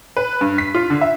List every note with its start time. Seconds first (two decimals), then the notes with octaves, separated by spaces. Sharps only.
0.17 B4
0.41 G2
0.58 B6
0.75 F4
0.90 D3
1.01 E5